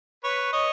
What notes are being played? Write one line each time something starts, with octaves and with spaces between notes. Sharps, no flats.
B4 C#5
C#5 D#5